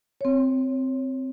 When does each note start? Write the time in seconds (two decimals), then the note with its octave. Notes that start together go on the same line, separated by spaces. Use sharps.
0.21 C4 C#5